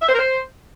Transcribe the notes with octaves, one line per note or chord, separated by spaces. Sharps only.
E5
C5
A#4
C5